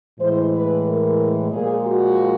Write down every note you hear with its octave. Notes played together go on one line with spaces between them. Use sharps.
A2 E3 G#3 C5
B4
A#4
A#2 F3 G#3 G#4
F#4